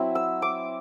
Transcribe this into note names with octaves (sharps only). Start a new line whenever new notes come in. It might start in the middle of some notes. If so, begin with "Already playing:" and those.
Already playing: F#3 C4 E4
E6
D6